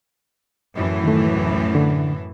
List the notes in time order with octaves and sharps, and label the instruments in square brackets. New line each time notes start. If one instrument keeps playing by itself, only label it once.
[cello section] F#2 A2 E3
[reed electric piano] D#3 A3
D2
D3